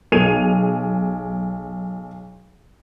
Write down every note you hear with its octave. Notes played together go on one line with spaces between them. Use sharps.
B1 G#4 G#6 D#7 F7